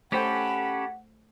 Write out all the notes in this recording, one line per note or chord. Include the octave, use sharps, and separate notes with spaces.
A3 C#4 G4 A4 C5 F#5 G5 B5